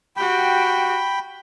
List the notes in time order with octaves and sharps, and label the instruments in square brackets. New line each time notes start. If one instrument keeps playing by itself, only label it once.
[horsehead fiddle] F#4 G4 [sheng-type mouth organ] G5 B5